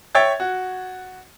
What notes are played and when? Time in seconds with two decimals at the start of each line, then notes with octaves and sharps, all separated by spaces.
0.15 C#5 E5 G5 G#6 A6
0.40 F#4